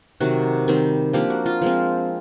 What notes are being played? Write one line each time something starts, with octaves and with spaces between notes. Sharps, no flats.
C3 D#3 F#3 F#4
D#3 G3 C4
F3 A#3 D4 G4
F#4
F4
F3 G#3 C4